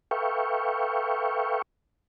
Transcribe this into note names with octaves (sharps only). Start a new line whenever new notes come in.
A4 B4 E5 F5 G5 C#6